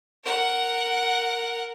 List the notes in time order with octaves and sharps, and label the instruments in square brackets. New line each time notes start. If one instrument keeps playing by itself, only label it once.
[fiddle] A#4 F#5